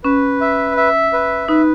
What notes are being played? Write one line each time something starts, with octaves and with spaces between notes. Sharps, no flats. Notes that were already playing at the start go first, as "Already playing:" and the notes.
C#4 B4
E5
E5
B4
D#4 B4